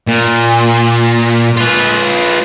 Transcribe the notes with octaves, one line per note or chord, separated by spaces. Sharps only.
A#2
F4 B4